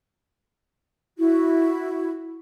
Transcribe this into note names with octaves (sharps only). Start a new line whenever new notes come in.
E4 F#4